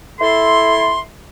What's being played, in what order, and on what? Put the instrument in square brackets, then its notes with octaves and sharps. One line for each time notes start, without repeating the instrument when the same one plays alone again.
[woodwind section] E4 A4 C6